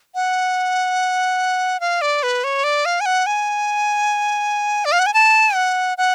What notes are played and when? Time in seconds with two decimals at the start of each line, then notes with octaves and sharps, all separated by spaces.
0.15 F#5
1.80 F5
2.01 D5
2.23 B4
2.44 C#5
2.64 D5
2.85 F5
3.01 G#5
3.06 F#5
3.26 G#5
4.85 D5
4.92 F5
4.99 F#5
5.06 G#5
5.14 A5
5.55 F#5
5.98 F#5